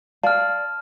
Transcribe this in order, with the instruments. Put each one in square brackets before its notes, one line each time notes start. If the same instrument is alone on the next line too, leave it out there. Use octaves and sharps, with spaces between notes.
[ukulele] D5 F5 [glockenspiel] A5 F6